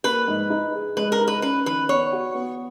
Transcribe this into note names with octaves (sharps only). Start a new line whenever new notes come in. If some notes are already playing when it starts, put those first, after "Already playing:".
A#3 B4
G#2
D#4
G#4
G#3 B4
A#4
D#4
B4
C#4 B4
D#3 B4
B3 C#5
F#4
B3